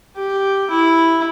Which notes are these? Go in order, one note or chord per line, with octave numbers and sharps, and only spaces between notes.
G4
E4